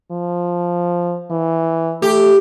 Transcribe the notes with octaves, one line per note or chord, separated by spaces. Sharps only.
F3
E3
A3 G4